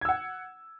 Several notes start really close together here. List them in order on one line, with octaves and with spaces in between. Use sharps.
G#6 E6 F#5